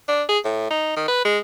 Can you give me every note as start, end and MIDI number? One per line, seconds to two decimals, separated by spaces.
0.08 0.23 62
0.29 0.38 68
0.45 0.68 45
0.70 0.93 63
0.96 1.06 51
1.08 1.21 71
1.25 1.38 56